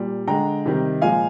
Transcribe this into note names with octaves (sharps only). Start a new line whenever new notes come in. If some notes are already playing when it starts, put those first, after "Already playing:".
Already playing: A#2 G3
D3 G#3 G5 A#5
C3 D#3 G3
A#2 F3 G#3 F5 G#5